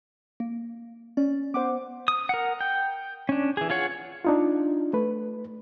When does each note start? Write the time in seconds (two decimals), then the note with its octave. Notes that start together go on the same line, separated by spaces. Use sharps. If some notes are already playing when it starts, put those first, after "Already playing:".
0.40 A#3
1.17 C#4 D5
1.54 B3 C5 F#5 D6
2.08 D#6
2.29 A#4 F#5
2.61 G5
3.29 C#4 D4
3.57 E3 G#4
3.70 F4 G#4 C#5 F#5
4.25 D4 D#4 F4
4.93 A3 B4